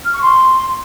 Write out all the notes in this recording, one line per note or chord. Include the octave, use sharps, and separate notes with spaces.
F6
C#6
C6